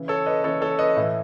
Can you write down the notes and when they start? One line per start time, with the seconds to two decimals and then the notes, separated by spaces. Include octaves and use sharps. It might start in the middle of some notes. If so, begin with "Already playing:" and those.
Already playing: C#3 E3
0.08 A4 C#5
0.26 B4 D#5
0.44 C#3 E3 A4 C#5
0.62 A4 C#5
0.79 B4 D#5
0.96 A2 E3